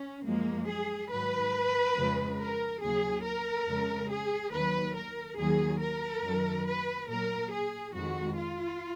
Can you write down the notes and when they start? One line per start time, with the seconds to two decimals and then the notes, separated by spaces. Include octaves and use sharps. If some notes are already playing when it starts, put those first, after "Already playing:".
Already playing: C#4
0.25 F#2 F3 G#3 A#3
0.68 G#4
1.10 G#2 D#3 F#3 B4
1.97 F2 C#3 F3 G#3
2.39 A#4
2.81 D#2 C#3 F#3 G#4
3.24 A#4
3.67 F2 C#3 G#3
4.10 G#4
4.52 D#2 D#3 F#3 B4
4.96 A#4
5.37 D#2 D#3 F#3 G#4
5.80 A#4
6.23 F#2 D#3 F#3
6.66 B4
7.08 A#2 F#3 A#4
7.52 G#4
7.93 F2 D#3 G#3 F#4
8.36 F4